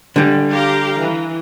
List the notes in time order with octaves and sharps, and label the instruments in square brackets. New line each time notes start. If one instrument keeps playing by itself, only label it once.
[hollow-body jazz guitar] D3 G3
[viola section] G4 F5 A#5
E3